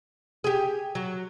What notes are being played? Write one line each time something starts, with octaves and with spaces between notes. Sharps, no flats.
G4 G#4
F#3